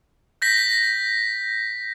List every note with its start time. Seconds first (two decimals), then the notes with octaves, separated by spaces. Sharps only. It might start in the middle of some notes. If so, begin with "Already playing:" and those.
0.42 G6 A#6 B6